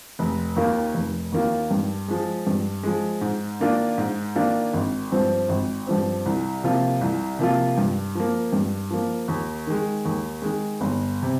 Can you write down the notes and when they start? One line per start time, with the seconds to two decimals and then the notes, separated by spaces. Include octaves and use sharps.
0.19 F1
0.56 D#2 D#3 A#3 F4
0.94 F1
1.32 D#2 D#3 A#3 F4
1.71 G2
2.08 F3 G#3
2.47 G2
2.83 F3 G#3
3.21 G#2
3.60 D#3 A#3 D4 F4
3.98 G#2
4.36 D#3 A#3 D4 F4
4.73 G#1
5.12 G2 F3 C4
5.49 G#1
5.87 G2 F3 C4
6.26 C2
6.64 C3 F3 A#3 F4
7.01 C2
7.39 C3 F3 A#3 F4
7.78 G2
8.15 F3 A#3
8.53 G2
8.91 F3 A#3
9.28 D#2
9.67 D#3 G#3
10.05 D#2
10.42 D#3 G#3
10.81 G1
11.22 C3